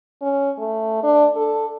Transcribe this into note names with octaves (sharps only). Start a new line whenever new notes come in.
C#4
A3
D4
A4